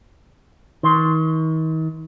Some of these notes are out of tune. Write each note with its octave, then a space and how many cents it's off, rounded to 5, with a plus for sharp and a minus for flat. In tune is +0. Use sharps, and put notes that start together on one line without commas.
D#3 +40 C6 +0